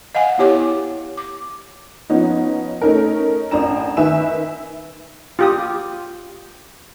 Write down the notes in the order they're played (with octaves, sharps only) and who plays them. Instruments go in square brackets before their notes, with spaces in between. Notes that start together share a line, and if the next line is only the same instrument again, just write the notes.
[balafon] D#5 F5 F#5 G#5
B3 E4 G4 C#5 D6
D6
[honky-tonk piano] F3 B3 C#4 D#4
A3 C#4 D#4 A#4
A1 C4 D4 A#5 E7
D#3 B4 E5 G#5 E7
[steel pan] F4 G4 D#6